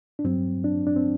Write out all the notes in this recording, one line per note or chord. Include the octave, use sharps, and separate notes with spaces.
D4
G2 F#3 C4
D4
D4
C4